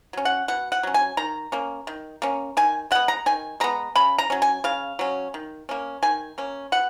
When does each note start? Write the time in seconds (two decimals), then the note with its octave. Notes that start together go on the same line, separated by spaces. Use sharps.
0.13 F#3 C#4
0.25 F#5
0.48 B2 F#5
0.72 F#5
0.83 F#3 C#4
0.94 G#5
1.17 D#3 A#5
1.52 A#3 C#4
1.87 D#3
2.22 A#3 C#4
2.57 D#3 G#5
2.91 G#3 B3 F#5
3.08 A#5
3.26 D#3 G#5
3.60 G#3 B3 A#5
3.95 C#3 B5
4.18 A#5
4.30 F#3 C#4
4.42 G#5
4.64 C#3 F5
4.99 F#3 C#4
5.34 D#3
5.69 A#3 C#4
6.03 D#3 G#5
6.38 A#3 C#4
6.72 B2 F#5